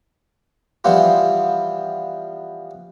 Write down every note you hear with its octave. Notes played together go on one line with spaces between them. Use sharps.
E3 F3 G3 B3 E4 F4